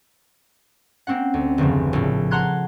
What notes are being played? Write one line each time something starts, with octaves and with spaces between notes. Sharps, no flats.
A#3 C4 C#4 F#5
D2
G1 E2 C#3 F3
A#1 A2
F#5 A5 A#5 C6 F#6 G#6